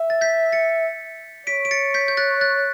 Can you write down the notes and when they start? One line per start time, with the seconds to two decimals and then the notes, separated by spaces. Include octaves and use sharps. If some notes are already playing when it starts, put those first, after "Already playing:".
Already playing: E5
0.10 A6
0.21 G6 B6
0.52 A6 C#7
1.47 C#5 B6 D7
1.65 D7
1.71 A6 C#7
1.94 G6 B6
2.08 G6
2.17 F#6 A6
2.41 F#6 A6